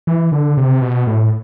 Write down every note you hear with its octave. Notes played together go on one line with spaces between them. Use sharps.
E3
D3
C3
B2
A2